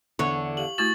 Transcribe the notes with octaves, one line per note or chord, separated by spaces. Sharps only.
E2 D3 D4 C#5
G4 F5 F#7
A3 E4 F#4 C#6 A6 F#7